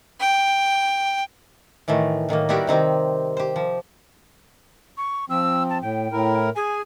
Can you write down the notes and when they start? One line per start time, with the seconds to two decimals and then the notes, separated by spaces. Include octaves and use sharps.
0.20 G5
1.88 A2 D#3 E3 A3
2.29 A2 D#3 F#3 A#3
2.49 G3 B3 E4 F#4 G4 A#4
2.67 C3 D#3 C4 G4
3.37 G4 C5
3.56 F3
4.97 C#6
5.30 F3 C4 E6
5.69 A5
5.82 A2 G5
6.12 A2 E4 A#4
6.56 G#4 G#5